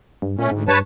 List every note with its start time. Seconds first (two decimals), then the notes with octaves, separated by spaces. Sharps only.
0.22 G2
0.39 A#2 A3 C#4
0.51 D2 G#2
0.68 G2 B4 C#5 A5